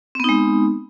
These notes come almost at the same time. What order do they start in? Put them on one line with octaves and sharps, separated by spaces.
C4 B3 D#4 G#3